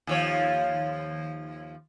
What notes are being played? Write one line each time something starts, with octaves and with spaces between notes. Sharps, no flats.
D#2 F3 C#5